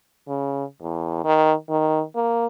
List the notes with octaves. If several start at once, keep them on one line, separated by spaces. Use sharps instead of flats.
C#3
E2
D#3
D#3
A#3